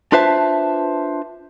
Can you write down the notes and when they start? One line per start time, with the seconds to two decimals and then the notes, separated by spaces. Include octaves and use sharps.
0.12 D4 F4 B4 C5 E5 A5